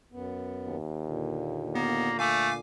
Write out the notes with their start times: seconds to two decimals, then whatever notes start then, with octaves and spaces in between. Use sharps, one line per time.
0.12 F#2 B3
0.66 D#2
1.06 A#2 D3
1.75 A#3 B3
2.19 A3 F5 G#5 D6